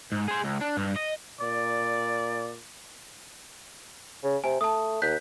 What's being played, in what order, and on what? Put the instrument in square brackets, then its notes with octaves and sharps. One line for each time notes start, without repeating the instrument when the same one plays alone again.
[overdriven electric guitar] G#2
G#4 C5
C#2
D4
G2
D#5
[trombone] A#2 [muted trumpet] D5
[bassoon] C#3
[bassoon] C3 [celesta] G#5
[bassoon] A3 [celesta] A5 D#6
[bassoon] D#2 [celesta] F#6 G6 B6